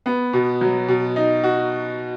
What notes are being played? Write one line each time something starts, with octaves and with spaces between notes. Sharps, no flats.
B3
B2
F#3
B2
D#4
F#4